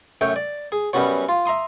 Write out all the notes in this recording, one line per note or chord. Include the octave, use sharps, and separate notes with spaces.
F#2 A3 C#5 G5
D5
G#4
F#2 G3 B3 C#4 F#4 C#5
F4
E5 A#5 C6 D#6